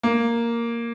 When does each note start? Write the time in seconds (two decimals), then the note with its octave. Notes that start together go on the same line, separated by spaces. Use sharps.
0.03 A#3